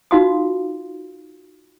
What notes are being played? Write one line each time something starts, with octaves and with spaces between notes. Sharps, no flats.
D#4 F4 F#4 F5 C6 D#6